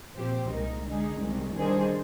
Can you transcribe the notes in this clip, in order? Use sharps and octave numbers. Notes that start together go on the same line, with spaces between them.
A#2 F3 C4 G4 C5
C2 A#2 G#3 D#4 A#4
D3 G#3 D#4 G#4
C2 C3 D#3 G#3
D#3 G3 D4 G#4 C5